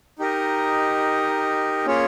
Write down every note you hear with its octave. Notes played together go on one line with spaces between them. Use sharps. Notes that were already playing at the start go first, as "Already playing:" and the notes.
D#4 G4 A#4 D#5
A#3 C#4 F4 G#4 C#5